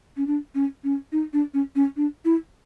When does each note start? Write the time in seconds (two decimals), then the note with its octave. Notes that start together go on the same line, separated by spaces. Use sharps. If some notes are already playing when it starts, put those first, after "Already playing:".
0.17 C#4
0.27 D4
0.55 C#4
0.84 C#4
1.12 D#4
1.33 D4
1.54 C#4
1.76 C#4
1.97 D4
2.25 E4